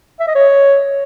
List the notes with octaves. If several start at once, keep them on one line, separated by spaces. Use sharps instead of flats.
E5
D#5
C#5